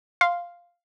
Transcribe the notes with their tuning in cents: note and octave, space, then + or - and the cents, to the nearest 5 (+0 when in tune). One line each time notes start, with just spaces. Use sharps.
F5 +0 C6 +0